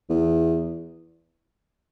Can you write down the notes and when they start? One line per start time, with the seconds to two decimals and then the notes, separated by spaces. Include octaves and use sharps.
0.10 E2